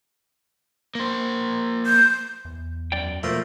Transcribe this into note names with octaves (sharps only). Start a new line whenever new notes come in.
A#3 C5
G6
E2
F#2 D5 G5
B2 F3 A3 A#3 C5